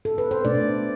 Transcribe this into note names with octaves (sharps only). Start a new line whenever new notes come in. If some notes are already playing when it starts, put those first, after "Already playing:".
A4
B4
C5
B2 A3 D4 D5